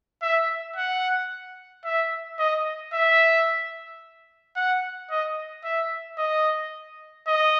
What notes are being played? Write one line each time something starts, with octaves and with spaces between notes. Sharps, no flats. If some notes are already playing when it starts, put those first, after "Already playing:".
E5
F#5
E5
D#5
E5
F#5
D#5
E5
D#5
D#5